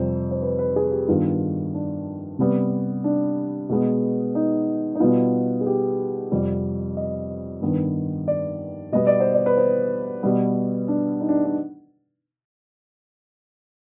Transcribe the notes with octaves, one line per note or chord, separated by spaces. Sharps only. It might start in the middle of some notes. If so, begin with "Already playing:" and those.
Already playing: F2 C3 G3 C5
C5
B4
B4
G#4
G4
G2 D#3 B3 F4
D4
C3 G3 B3
D4
B2 G#3 B3
D#4
D#4
B2 G3 B3 F4
G#4
G4
F2 C3 G3
D#5
G2 D#3 B3
D5
B2 G3 B3 D#5
D5
C5
D5
B4
C5
B2 G3 B3
D4
D#4
D4
D4